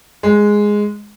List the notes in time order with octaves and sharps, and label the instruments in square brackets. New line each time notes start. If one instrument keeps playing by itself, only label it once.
[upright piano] G#3